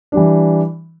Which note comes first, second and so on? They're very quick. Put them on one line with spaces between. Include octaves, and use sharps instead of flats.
D4 G3 E3